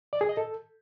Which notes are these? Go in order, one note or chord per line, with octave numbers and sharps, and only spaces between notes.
D5
G#4
D#5
A4